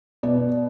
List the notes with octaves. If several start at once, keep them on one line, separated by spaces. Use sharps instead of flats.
B2 D5